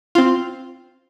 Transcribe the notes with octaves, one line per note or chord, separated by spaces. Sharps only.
C4 F4